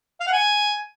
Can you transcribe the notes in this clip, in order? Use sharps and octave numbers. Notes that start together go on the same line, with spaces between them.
F5
F#5
G#5